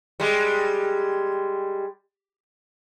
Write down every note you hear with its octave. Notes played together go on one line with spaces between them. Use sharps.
G3 G#3